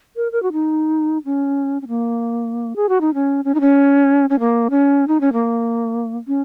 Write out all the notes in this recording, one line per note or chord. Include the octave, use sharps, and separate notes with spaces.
A#4
A#4
F#4
D#4
C#4
C#4
A#3
G#4
F#4
D#4
C#4
C#4
D#4
C#4
C#4
A#3
C#4
D#4
C#4
A#3
C#4